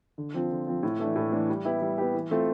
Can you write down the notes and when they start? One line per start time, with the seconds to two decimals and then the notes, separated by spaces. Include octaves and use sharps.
0.18 D3
0.34 F3 C4 F4
0.51 D3
0.67 F3 C4 F4
0.83 A2
0.99 E3 A3 D4
1.16 A2
1.32 E3 A3 D4
1.49 G3
1.65 B3 E4 G4
1.82 G3
1.98 B3 E4 G4
2.14 E3
2.31 A3 C4 F4 A4